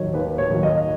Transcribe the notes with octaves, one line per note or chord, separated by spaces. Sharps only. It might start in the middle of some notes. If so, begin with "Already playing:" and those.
Already playing: D#2 D#3 F#3 C#5 D#5
D#2 B4
C#5
D#3 F#3
D#5